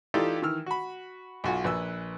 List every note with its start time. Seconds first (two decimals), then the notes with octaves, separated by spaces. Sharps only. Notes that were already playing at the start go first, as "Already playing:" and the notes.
0.14 E3 D#4 F4 G4 A4 D5
0.42 D#3 E3 E6 F6
0.66 F#4 B5
1.44 B1 F4 F#4 G#5
1.64 A#1 B4 G#5 E6